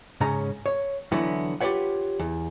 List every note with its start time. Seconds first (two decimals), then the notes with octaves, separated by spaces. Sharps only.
0.21 G#2 C#3 C#4 A#5
0.66 C#5
1.12 D3 E3 F#3 B3 E4
1.61 F4 G4 A4 B4 C#5 F#5
2.19 E2